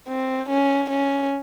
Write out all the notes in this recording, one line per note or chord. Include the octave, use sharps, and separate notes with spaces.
C4
C#4
C#4